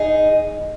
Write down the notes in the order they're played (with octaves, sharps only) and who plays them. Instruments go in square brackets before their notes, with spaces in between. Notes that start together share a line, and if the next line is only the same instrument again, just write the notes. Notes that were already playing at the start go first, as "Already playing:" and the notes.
Already playing: [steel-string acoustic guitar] D#4 G#4